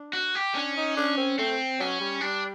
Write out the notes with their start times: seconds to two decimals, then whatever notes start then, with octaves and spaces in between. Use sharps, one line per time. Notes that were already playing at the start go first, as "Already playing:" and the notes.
Already playing: D4
0.13 F#4
0.35 G4
0.55 C#4 D4
0.77 D#4
0.96 D4
1.17 C4
1.38 A3 C4
1.79 F#3 C#4
2.00 G3
2.21 G3 D4